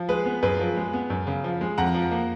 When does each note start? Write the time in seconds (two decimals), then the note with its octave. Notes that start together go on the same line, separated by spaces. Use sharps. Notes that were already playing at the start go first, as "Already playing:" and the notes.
Already playing: F3
0.09 G#3 G#4 B4
0.26 B3
0.43 F#2 G#4 B4
0.59 F3
0.76 G#3
0.93 B3
1.10 F#2
1.27 C#3
1.44 F3
1.61 G#3
1.78 F2 F#5 A#5
1.94 F3
2.11 A#3